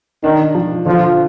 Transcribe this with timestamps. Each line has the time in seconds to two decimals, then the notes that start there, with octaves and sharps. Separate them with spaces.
0.24 D#3 D4
0.55 F3
0.86 D3 F3